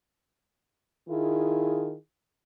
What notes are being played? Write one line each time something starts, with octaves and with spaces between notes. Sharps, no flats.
D#3 E4 F4 G#4